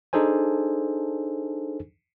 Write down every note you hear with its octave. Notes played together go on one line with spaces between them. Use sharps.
D4 D#4 G#4 A4 C5 G#5